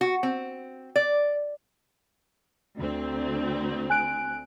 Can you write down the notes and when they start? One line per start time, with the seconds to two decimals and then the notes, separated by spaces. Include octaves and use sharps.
0.01 F#4
0.23 C4
0.96 D5
2.77 D2 C4
3.90 G#5 F#6 D7